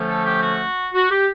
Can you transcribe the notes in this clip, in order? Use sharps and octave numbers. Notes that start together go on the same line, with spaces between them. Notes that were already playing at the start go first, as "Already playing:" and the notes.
Already playing: D3 F3 A3 C#4
A4
G4
F#4
F#4
G4